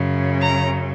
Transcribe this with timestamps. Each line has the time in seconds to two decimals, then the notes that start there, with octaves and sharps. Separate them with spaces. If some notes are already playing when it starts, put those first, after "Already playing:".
Already playing: F#2 C#3 F#3
0.42 A#5